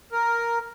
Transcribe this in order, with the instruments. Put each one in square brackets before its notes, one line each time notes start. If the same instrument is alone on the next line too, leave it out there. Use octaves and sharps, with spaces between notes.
[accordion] A#4